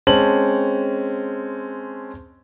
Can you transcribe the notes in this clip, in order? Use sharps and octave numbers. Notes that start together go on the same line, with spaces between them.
G#3 C4 C#4 A5 F#7